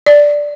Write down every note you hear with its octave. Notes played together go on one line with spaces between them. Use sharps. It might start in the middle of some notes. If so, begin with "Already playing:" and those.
D5